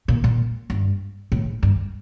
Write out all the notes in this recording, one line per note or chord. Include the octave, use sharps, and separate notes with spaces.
A#2
A#2
G2
A2
G2